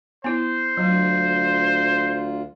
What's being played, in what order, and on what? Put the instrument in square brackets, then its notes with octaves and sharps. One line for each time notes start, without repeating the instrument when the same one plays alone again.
[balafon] B3 E4 [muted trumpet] C5
[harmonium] D2 F4 [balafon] F#3